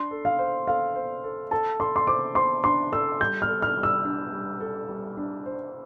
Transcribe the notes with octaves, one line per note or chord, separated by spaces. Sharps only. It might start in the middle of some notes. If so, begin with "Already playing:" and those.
Already playing: D4 C6
A4
F5
C5
A4 F5
C5
A4
A4 A5
A4 C6
C6
C5 D6
C5 C6
D4 C6
A4 E6
G3 G6
F6
A4
F6
G3
E6
D4
G3
A4
G3
D4
C5